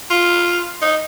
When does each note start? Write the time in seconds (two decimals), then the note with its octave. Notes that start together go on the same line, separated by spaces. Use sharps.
0.11 F4
0.82 D#4